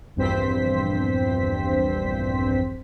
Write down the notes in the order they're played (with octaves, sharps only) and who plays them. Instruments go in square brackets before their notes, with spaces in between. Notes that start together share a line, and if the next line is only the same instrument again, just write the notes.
[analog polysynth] A#1 E2 G2 C4 C5 B6